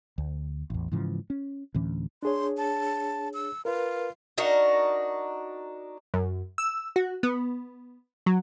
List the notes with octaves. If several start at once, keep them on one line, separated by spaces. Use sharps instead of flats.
D2
A1 E2
G#2 C#3 E3 F3
C#4
D2 A2 E3 C#4
D4 G#4 C#5 C6
A5
E6
F4 A#4 B4
D4 D#4 F#4 A#4
F#2
E6
F#4
B3
F#3